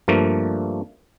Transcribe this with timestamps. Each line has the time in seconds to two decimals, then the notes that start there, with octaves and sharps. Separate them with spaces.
0.08 G2 F3 A3 A#3